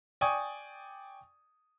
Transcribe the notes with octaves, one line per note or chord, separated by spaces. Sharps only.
D5 G5 G#5 C#6 D#6